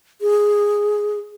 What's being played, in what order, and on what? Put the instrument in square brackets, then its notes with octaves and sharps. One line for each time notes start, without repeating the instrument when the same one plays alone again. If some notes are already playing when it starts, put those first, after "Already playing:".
[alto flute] G#4